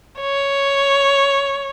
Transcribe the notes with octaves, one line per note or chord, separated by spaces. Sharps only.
C#5